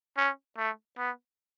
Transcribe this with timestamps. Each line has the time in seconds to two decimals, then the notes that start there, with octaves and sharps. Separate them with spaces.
0.17 C#4
0.58 A3
0.98 B3